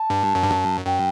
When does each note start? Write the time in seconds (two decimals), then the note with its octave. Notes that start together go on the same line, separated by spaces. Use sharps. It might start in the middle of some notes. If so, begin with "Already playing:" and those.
Already playing: A5
0.10 G2
0.35 F#2
0.43 G2
0.51 F#2
0.86 F#2 G5